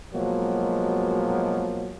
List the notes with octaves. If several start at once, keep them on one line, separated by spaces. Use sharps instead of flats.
B2 F3 F#3 G#3 A#3